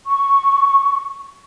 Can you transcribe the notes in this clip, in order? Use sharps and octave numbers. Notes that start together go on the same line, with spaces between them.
C#6